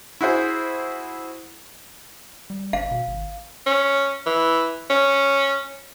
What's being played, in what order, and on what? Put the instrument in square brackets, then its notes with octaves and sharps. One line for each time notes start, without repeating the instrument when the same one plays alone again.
[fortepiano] E4 F#4 G#4 C5
[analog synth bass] G3
[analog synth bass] G1 [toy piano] F5
[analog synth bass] B2
G#1
[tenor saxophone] C#4
E3
C#4